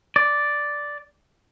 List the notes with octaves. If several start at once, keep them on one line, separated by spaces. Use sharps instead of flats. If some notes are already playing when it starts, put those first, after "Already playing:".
D5